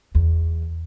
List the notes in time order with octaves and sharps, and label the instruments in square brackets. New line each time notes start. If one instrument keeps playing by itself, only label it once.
[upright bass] E2